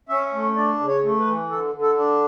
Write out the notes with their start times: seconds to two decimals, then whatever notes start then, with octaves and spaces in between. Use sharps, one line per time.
0.09 C#4 E5
0.33 A3
0.56 D4 D5
0.79 C#3
0.88 C#5
1.03 A3
1.19 B4
1.27 E3
1.50 D3 A4
1.74 D3
1.82 A4
1.97 D4